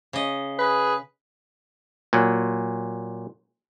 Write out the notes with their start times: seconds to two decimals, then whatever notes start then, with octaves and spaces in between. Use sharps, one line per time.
0.13 C#3 D#5
0.59 G#4 B4
2.13 A#2 F#3